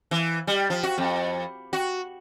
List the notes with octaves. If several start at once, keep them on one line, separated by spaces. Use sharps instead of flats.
E3
G3
F3
F#4
F2
F#4